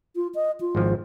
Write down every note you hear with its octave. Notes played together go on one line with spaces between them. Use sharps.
F4
D#5
F4
G#1 F3